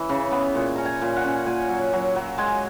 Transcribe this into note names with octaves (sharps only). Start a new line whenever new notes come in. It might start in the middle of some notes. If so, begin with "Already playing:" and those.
Already playing: E3 C#5
C#3
B3
A#2 C#5
C#4 A#5
G#5
A#2
F#5
C#4
A#2 G#5
F#3
F#3
F#3
G#3 G#5